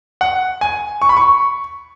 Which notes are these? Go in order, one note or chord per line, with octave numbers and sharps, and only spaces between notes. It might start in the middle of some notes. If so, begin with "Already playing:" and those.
F#5
G#5
C#6
B5
C#6